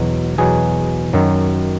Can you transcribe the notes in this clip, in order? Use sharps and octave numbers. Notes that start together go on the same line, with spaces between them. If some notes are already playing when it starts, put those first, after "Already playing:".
Already playing: E2 B2 F#3
E2 B2 F#3 G#4
F#2 D#3 F#3